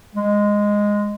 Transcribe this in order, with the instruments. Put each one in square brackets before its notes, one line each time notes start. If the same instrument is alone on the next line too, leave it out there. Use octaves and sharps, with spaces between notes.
[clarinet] G#3